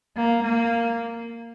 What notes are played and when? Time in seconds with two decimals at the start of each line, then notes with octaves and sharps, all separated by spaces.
0.16 A#3
0.44 A#3